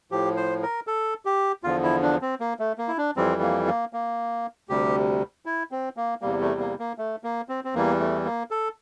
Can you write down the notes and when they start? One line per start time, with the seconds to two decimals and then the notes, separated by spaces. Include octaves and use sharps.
0.11 A2 F3 G4
0.37 C5
0.63 A#4
0.87 A4
1.25 G4
1.64 E2 D3 F3 F4
1.83 E4
2.02 D4
2.21 C4
2.40 A#3
2.59 A3
2.78 A#3
2.88 E4
2.98 D4
3.17 F2 E3 G3 C4
3.42 A#3
3.67 A#3
3.93 A#3
4.69 D2 C3 G3 G4
5.46 E4
5.71 C4
5.97 A#3
6.22 E2 C3 G3 A#3
6.41 A3
6.60 A#3
6.79 A#3
6.98 A3
7.24 A#3
7.49 C4
7.64 C4
7.74 E2 E3 G3 A#3
8.00 A3
8.25 A#3
8.51 A4